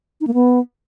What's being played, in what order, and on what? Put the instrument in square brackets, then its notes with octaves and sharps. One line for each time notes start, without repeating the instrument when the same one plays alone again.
[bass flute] D#4
A#3
B3